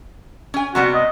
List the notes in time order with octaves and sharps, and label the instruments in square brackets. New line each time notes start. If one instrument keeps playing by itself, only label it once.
[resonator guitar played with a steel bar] C#4 G#5
[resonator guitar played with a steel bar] C3 G3 B3 [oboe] F#4
[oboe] D#5